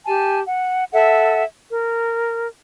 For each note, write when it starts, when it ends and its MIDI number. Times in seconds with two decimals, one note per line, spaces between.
0.06 0.41 67
0.06 0.41 80
0.06 0.41 81
0.47 0.84 78
0.92 1.43 69
0.92 1.43 76
0.92 1.43 78
1.70 2.46 70